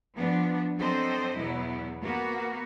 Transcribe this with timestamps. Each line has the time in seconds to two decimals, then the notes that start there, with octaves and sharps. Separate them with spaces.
0.15 F3 B3 D4
0.78 F#3 C4 D4 A4 C5 D#5
1.37 E2 B2 F#3 B3 E4
2.02 A#3 B3 F#4